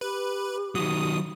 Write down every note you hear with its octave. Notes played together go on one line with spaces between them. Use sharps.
G4 B4
D#3 F#3 D#6